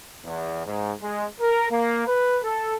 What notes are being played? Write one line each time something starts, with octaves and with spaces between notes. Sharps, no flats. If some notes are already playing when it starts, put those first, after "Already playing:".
E2
G#2
G#3
A#4
A#3
B4
A4